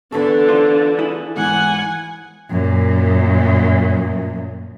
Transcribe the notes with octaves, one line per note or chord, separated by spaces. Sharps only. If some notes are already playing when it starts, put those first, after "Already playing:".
D3 E3 B3 A4
D4 F4 C5
E4 G#4
E2 G#2 E3 F#5 G#5
F#2 A#2